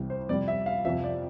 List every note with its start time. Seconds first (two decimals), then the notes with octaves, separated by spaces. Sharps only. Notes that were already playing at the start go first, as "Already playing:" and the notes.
Already playing: C2 C3 E3 G3
0.10 C5
0.29 F2 C3 G3 D5
0.48 E5
0.66 F5
0.85 F2 C3 F3 E5
1.04 D5